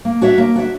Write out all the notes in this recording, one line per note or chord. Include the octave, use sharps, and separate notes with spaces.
A#3
D4 F#4 C#5 E5
A#3
D4 F#4 C#5 E5